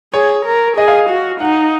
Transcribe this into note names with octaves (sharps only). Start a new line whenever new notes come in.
G#4 C#5
A#4
G#4 D#5
F5
F#4
D#4 F#5